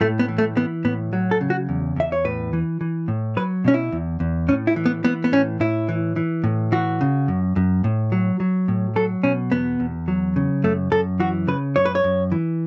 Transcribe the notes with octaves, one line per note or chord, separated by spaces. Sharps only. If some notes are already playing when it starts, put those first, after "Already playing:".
A2 A3
B3
E3
A3
E3 B3
A2 B3
F#3
A4
C#3
F#4
E2
E2 E5
C#5
A2 B4
E3
E3
A2
F#3 B4
B2 C#4
E4
E2
E2
A2 C#4
E4
E3
B3
E3 B3
B3
A2 C#4
A2 E4
E3
E3
A2
E3 F#4
C#3
F#2
F#2
A2
F#3
F#3
A2
F#3 A4
B2 C#4
E2 B3
E2
F#3
C#3
F#2 A3
F#2 A4
E3 F#4
C#3 B4
F#2 C#5
B4
C#5
F#2
E3